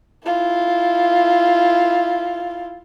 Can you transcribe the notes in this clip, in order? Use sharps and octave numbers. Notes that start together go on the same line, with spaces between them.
E4 F4